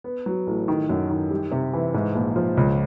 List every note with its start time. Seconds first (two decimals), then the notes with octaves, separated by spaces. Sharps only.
0.04 B3
0.26 F#3
0.47 A1
0.68 D#3
0.89 F#2
1.10 D#3
1.31 G3
1.52 C3
1.73 E3
1.94 G#2
2.15 A#1
2.36 F3
2.57 C#2